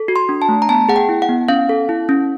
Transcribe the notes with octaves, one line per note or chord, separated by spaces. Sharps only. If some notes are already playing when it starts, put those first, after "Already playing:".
Already playing: A4
F#4
C6
D4
A5
A3
A#5
B3 A5
G#4 F#5
G5
E4
F#5
B3
C#4 F5
A4
E4
C#4